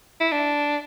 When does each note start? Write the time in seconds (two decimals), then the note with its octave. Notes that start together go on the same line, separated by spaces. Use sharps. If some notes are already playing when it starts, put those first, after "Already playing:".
0.20 E4
0.32 D4